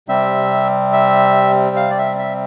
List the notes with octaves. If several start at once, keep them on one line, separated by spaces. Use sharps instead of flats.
C3 G3 C4 E5
E5
F5
D5
E5
E5